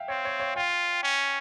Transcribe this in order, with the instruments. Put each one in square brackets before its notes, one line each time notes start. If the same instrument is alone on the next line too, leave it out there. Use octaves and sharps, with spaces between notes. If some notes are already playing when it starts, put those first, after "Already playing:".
Already playing: [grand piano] E5 F5 G5
[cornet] C4 [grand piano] C#5
[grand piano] C#5
C#5
[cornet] F4 [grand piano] G5
[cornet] C#4